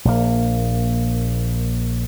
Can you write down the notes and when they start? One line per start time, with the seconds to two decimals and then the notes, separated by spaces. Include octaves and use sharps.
0.05 A#1 A#3